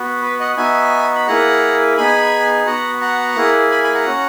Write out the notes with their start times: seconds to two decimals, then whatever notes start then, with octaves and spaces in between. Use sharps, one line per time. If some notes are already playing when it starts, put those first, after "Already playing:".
Already playing: B3 F#4
0.22 B4
0.40 D#5 F#5
0.57 B3 D#4 F#4 E5 G#5
1.15 B5
1.27 A#3 E4 G#4 F#5 A#5
1.97 B3 D#4 G#4 G#5 B5
2.67 B3 F#4 F#5 A#5
3.01 F#5 A#5
3.36 A#3 E4 G#4
3.71 G#5 B5
3.83 G#5 B5
3.95 F#5 A#5
4.06 C#4 F#4